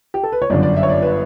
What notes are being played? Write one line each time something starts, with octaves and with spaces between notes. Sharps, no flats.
G4
A4
B4
C#5
G1 F#2 D3 D5
D5
E5
C#5
D5
B4